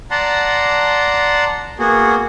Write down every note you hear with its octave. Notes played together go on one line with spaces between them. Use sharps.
D5 F#5 A5 A#5 C6
A#3 B3 F#4 G#4